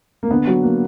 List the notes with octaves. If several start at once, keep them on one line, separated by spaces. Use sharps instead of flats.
A#3
D3 B3
F#3
A#3